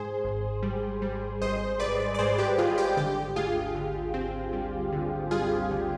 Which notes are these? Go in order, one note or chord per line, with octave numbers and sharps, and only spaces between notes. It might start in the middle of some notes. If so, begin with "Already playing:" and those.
Already playing: G#2 G#4 C5
G#1
G3
G3
G#1 C5 D#5
G#1 B4 D5
D5
G#2 G#4 C5
G4 B4
G#1 F4 G#4
G4
D3 G4
D2 F4 G#4
D3
C4
G3
D3
G3 F4 G#4
D3